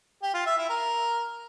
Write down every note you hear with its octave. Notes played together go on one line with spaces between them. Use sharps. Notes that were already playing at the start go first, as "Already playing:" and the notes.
G4
F4
E5
E4
A#4